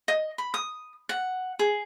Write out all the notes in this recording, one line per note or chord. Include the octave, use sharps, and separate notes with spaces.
D#5
B5
D#6
F#5
G#4